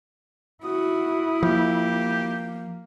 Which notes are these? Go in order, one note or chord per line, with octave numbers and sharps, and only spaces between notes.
E4 F#4 D#6
F3 A#3 G4